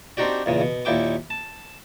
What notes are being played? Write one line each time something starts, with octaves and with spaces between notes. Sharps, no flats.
C4 D4 D#4 F#4 G4 D5
E2 A#2 C#3
B2
D#2 A#2 E4 G5 D6
A5